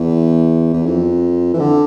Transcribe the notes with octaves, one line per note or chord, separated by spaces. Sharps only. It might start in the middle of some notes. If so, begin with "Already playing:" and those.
Already playing: E2
E2
F2
E3
D3